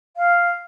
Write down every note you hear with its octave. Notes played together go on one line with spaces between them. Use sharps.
F5